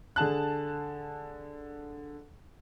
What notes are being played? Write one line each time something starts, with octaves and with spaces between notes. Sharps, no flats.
D3 G#4 A5 F#6